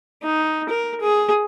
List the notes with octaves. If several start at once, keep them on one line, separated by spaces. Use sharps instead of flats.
D#4
A#4
G#4